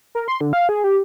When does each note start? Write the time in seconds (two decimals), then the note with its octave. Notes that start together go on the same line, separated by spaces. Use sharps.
0.15 A#4
0.28 C6
0.41 D3
0.53 F5
0.69 G#4
0.84 G4